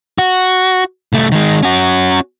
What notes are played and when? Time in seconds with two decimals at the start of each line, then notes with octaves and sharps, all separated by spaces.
0.18 F#4
1.13 C2 A3
1.32 D#3 G#3
1.63 C#4 F#4